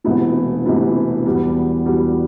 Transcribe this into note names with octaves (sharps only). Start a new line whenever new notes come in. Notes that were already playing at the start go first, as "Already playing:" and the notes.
E1 D2 C3 E3 B3
E1 D2 C3 E3 B3
E2 B2 G3 B3
E2 B2 G3 B3